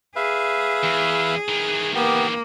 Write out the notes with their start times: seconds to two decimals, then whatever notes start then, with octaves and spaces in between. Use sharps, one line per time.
0.16 G#4 B4 E5 F5
0.84 E2
1.48 D#3 E3
1.95 A#3 B3 G4